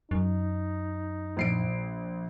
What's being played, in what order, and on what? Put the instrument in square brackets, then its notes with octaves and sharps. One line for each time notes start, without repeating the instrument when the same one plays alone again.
[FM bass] F#2 [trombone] D#4
[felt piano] A#1 C7 D7